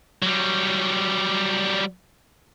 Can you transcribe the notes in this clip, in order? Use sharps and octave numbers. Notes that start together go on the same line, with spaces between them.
F#3 G3